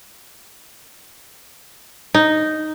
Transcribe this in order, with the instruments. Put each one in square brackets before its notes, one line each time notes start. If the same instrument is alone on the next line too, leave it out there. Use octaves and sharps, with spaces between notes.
[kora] D#4